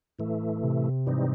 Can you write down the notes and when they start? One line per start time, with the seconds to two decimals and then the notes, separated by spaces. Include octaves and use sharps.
0.19 A2 E3 A3
0.63 C3
1.07 G#2 E3 G3 C4 D#4